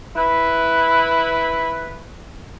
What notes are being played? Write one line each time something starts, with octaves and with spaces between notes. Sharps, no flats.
E4 B4